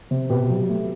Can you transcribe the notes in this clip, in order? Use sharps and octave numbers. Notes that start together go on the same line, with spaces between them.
C3
B2 G4 B4
F#3
A3